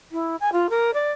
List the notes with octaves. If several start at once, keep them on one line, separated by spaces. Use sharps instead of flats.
E4
G#5
F4
A#4
D5